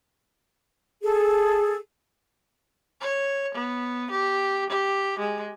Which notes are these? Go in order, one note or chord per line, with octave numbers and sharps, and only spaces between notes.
G#4 A4
C#5
B3
G4
G4
G#3